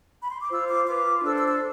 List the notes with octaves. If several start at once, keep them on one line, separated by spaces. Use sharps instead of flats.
B5
C6
D6
F4 C5 E6
D6
F4 B4 D6
D4 A4 C5 E6
E6
E6